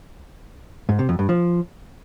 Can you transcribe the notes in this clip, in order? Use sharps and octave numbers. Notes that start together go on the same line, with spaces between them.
G#2
C3
F2
G2
F3